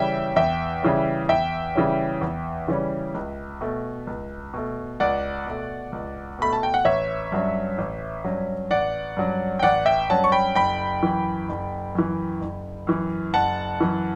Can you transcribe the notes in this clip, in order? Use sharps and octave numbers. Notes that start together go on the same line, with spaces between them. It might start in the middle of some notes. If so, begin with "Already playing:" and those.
Already playing: C#3 E3 G3 C#4 E5 G5
E2 E5 G5
C#3 E3 G3 C#4
E2 E5 G5
C#3 E3 G3 C#4
E2
C#3 E3 G3 C#4
C#2
B2 A3
C#2
B2 A3
C#2 D5 F#5
B2 A3
C#2
B2 A3 B5
A5
G5
F#5
A1 C#5 E5
G2 F#3 C#4
A1
G2 F#3 C#4
A1 D5 F#5
G2 F#3 C#4
G5
A1 D5 F#5
E5 G5
G2 F#3 C#4 F#5 A5
C#6
G5 B5
F#1 G5 B5
F#2 E3
F#1
F#2 E3
F#1
F#2 E3
F#1 F#5 A5
F#2 E3